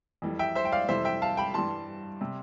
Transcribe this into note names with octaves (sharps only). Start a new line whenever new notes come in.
F2 E3 G3
E5 G5
C5 E5
G5
D5 F5
F2 C3 E3 G3 C5 E5
E5 G5
F5 A5
G5 B5
G2 E3 G3 A5 C6
C3 G3